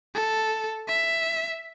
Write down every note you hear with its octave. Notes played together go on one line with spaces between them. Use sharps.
A4
E5